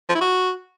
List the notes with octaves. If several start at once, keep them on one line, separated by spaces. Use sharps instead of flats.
F3
E4
F#4